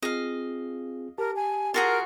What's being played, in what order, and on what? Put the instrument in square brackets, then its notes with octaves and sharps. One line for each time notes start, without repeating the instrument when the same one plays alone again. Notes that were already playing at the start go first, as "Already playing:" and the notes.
[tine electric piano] C4 F4 G#4 [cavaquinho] D#5 F5
[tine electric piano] G4 A5 [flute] A#4
[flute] G#5
[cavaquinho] F4 F#4 G#4 [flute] A#4